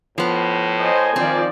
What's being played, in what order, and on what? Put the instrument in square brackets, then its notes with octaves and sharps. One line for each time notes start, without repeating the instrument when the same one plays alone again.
[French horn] A2 [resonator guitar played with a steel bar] F3 B3
[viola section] C5 D#5 [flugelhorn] G#5
[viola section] D#3 F3 D5 [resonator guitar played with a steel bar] C4